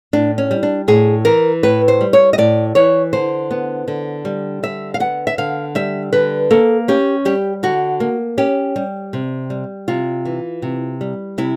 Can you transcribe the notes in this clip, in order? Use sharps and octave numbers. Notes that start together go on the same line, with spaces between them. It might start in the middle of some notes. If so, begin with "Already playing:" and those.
A2 D4
C#4
G3
D4
A2 G#4
E3 A#4
A2 B4
C5
G3
C#5
D#5
A2 D5
E3 C#5
D3 C5
B3
D3
G3
D3 E5
F5
B3 F#5
E5
D3 F5
G3 E5
D3 B4
A#3 A4
C#4 G4
G3 G4
D3 F#4
A#3
C#4 G4
G3
C3
G3
C3 F4
E3
C3
G3
C3 E4